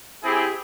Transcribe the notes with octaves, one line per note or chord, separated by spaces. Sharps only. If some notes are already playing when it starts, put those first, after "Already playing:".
C4 E4 G4 G#4